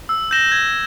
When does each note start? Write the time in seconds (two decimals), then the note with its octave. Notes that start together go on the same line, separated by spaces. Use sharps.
0.09 E6
0.31 G6 A#6 E7 G7
0.52 G#6